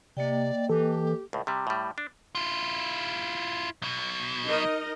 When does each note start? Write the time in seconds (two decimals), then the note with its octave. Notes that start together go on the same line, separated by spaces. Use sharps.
0.17 C3 A#3 D5 D#5 G5
0.69 E3 G4 A4
1.33 C#2 A2
1.47 C3 G3
1.67 A2 G3
1.98 D4
2.35 E4 F4
3.82 B1 B2
4.45 D#4 A#4 D#5